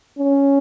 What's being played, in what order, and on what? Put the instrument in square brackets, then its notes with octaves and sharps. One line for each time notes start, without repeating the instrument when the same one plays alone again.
[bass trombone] C#4